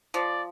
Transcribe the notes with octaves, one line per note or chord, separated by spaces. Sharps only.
F3 D5